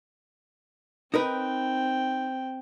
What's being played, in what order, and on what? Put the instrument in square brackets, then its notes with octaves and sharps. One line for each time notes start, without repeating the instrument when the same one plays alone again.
[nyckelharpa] C4 G5 [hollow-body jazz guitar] D#4 A#4 B4